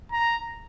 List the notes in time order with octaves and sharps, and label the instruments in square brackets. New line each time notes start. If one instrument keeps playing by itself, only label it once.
[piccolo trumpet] A#5